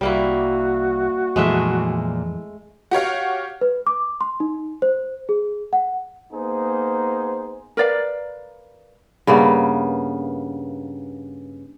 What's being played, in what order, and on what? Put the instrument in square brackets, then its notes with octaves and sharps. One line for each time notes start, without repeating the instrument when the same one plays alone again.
[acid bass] C2 [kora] G3 A#3 E4 [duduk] F#4
[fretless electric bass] F2 E3 [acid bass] A#2 [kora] G#3 A3 E5
[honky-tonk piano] F#4 G4 C#5 F5
[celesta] B4
D6
C6
D#4
C5
G#4
F#5
[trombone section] A#3 B3 D#4 G#4 C5
[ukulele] A#4 B4 D5 F5
[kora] G2 C#3 A#3 B3